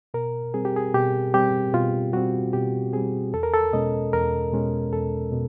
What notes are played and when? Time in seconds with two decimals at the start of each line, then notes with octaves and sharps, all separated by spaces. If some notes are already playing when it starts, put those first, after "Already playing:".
0.14 B2 A#4
0.54 G3 C4 G#4
0.65 G4
0.76 G#4
0.94 B2 G4
1.34 G3 C4 G4
1.73 B2 F4
2.13 G3 C4 F#4
2.53 B2 G4
2.93 G3 C4 G#4
3.33 E2 A4
3.43 A#4
3.54 A4
3.73 B2 G#3 C#4 D#5
4.13 E2 A#4
4.53 B2 G#3 C#4
4.93 E2 A4
5.32 B2